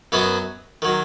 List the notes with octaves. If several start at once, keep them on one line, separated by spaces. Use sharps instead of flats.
F#2 F#3 B3 F#4 D#5
D#3 F#3